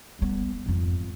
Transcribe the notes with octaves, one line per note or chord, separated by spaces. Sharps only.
G3 B3
F2 G#2